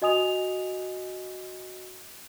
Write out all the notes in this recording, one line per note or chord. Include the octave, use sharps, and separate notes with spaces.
F#4 D#5 G#5 D#6 F7